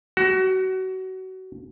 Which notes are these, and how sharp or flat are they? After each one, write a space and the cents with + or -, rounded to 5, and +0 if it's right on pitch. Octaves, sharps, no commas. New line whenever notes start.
F#4 +25